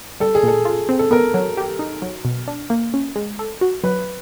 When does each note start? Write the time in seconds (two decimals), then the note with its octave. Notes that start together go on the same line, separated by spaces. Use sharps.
0.20 G3 A4
0.35 G#4
0.43 A#2 A4
0.65 F4
0.89 C4
0.99 A4
1.11 B3 A#4
1.34 F#3
1.57 G4
1.79 D#4
2.02 F#3
2.25 B2
2.48 D4
2.70 A#3
2.94 C#4
3.16 G#3
3.39 A4
3.61 F#4
3.84 F#3 B4